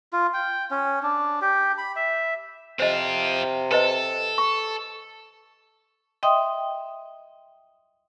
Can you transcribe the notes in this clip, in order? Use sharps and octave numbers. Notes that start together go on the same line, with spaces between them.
F4
G5
C#4
D4
G4
B5
E5
C3 C4 F4 C5 D#5
A4 B4 C5 D#5
C#6
D#5 E5 G5 C6 D#6